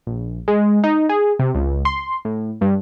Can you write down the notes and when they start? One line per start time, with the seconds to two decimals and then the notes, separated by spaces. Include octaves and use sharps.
0.07 A#1
0.48 G#3
0.84 D#4
1.09 G#4
1.39 C3
1.55 C#2
1.85 C6
2.25 A2
2.61 G2